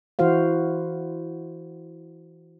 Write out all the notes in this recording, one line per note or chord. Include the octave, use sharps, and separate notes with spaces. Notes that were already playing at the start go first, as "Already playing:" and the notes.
E3 E4 F#4 C5 F5